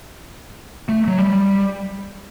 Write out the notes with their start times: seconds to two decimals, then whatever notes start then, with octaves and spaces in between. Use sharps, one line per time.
0.89 A3
1.07 F#3
1.19 G3